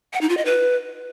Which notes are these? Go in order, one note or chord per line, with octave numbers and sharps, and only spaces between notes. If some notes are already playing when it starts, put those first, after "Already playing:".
F#5
D#4
F4
D#5
B4